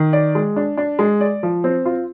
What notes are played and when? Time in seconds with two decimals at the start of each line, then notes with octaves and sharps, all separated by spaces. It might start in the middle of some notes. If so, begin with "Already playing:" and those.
Already playing: D#3
0.13 D5
0.35 G#3
0.56 D4
0.77 D4
0.99 G#3
1.21 D5
1.43 F3
1.64 C4
1.85 F4